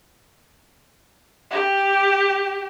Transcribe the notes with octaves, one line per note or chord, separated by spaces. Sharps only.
G4